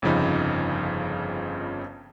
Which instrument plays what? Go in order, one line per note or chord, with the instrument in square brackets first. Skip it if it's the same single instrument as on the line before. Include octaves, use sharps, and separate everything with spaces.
[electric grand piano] G1 F2 C#3 F3 D#4 B5